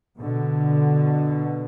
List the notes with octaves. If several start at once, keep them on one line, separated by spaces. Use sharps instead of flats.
B2 D3